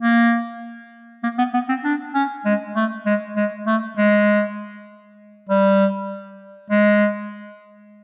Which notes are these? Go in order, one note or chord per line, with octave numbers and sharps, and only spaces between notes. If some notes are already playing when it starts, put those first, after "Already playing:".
A#3
A#3
B3
B3
C4
D4
C#4
G#3
A3
G#3
G#3
A3
G#3
G3
G#3